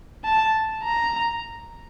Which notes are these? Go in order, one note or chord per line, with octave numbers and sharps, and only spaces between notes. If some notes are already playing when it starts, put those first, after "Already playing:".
A5
A#5